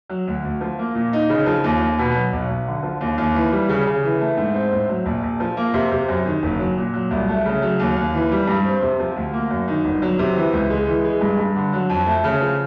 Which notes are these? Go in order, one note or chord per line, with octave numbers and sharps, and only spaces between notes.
F#3
D2
D2
F3
A#3
A#2
D#4
C#3
F3
D#2
D#2
B2
F#3
B1
B1
D3
F3
D#2
D#2
E3
G3
C#3
C#3
E3
A3
G#2
C4
A2
F#3
A#1
A#1
F3
A#3
C3
C3
F#2
D#3
F#1
F#3
A#2
F#3
C2
A3
C#3
F#3
D#2
D#2
E3
G3
G2
C4
C3
F3
D2
A#3
F#2
D#3
G1
F#3
C3
E3
C#2
G#3
E3
G#3
G2
G2
D3
F#3
F2
A3
C#3
F3